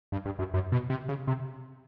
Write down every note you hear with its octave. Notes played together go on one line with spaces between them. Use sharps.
G2
G2
F#2
F#2
B2
C3
C#3
C3